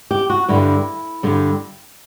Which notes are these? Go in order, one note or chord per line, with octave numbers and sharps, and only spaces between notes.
G4
F#4
G2 D3 G3 E4
G2 D3 G3